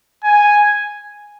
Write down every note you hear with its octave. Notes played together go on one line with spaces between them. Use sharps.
G#5